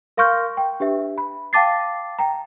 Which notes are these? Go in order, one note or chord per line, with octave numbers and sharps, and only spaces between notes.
A#4 F5 C6 C#6 F6 G6
G5
D4 G4 B4 E5
B5
F5 G5 A5 D6 A6 C7
G5 A#5